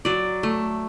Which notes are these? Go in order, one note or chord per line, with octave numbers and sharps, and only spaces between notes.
F#3 D5
A3